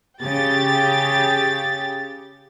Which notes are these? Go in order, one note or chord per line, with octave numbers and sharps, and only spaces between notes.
C#3 G4 G5 A6